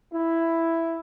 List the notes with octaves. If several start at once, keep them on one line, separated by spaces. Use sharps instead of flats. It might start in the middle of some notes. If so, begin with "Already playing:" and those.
E4